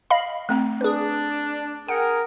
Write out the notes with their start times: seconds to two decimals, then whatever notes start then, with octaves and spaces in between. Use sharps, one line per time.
0.10 D#5 F5 B5
0.49 A3 C4 G5
0.81 D4 G#4 B4
1.88 G#4 A#4 F#5 G5